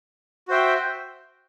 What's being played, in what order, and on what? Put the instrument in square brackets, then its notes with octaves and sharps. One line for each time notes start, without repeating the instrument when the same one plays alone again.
[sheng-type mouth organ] F#4 C5 E5 G5